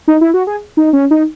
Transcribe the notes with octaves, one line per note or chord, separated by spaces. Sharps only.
D#4
E4
F#4
G#4
D#4
C#4
D#4